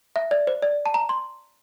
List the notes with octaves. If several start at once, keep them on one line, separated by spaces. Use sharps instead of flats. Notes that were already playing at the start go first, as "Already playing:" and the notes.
E5
D5
C5
D5
A5
A#5
C6